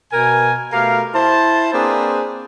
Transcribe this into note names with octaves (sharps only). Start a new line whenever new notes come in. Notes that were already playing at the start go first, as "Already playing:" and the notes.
B2 A#4 G#5
B2 A3 G4 A#4 F5
E4 C5 A5
A#3 C4 D4 G#4 B4 C5